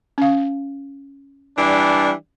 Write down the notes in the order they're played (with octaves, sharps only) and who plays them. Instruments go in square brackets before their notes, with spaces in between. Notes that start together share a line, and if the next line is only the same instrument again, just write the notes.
[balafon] C#4 F5
[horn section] E3 G3 D4